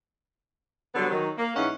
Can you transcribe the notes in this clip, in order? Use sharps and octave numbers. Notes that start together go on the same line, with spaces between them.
D3 F#3 G3 B3
D#3 F#3
A#3
G#2 E3 C#4 D#4 F#5